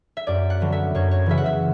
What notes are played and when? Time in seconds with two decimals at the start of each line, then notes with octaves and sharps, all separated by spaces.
0.17 E5
0.27 F#2 D5
0.50 F#5
0.61 D3 F#3 B3
0.72 E5
0.95 F#2 C#5
1.11 C#5
1.26 C#3 E3 B3 E5
1.38 F#5
1.46 E5